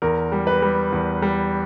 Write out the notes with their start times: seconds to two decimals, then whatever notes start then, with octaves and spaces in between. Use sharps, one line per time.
0.02 E2 A#4
0.32 G3
0.47 B4
0.62 G3
0.92 E2
1.22 G3